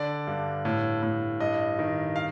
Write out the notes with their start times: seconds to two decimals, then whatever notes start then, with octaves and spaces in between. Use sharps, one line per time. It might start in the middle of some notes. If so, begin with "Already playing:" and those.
Already playing: D3 D5
0.27 G2
0.65 A2
1.03 A2
1.40 G2 D#5
1.79 D#3
2.16 F5